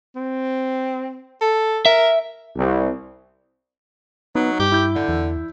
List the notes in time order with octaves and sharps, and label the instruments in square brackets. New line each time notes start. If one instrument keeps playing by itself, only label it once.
[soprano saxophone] C4
A4
[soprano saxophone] A#4 [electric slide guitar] E5
[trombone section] C2
[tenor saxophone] F#3 [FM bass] B3 [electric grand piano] D#4
[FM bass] G2 [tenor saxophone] G4
[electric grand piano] E4 G6
[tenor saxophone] D3
[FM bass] E2